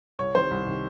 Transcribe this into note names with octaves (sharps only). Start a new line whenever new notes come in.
C2 C#5
C3 D#3 C5
C2
C3 D#3